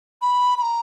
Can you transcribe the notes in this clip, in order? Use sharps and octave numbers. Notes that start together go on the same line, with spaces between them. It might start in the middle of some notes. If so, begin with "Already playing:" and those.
B5
B5
A#5